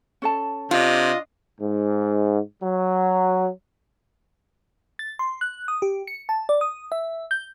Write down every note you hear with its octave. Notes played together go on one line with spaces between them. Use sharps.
C#4 A4 A5
C3 D4 F4 D#5
G#2
F#3
A6
C6
F#6
D#6
G4
C#7
A5
D5
D#6
E5
G6